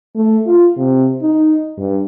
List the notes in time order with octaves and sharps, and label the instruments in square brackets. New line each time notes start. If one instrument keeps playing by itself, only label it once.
[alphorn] A3
F4
C3
D#4
G2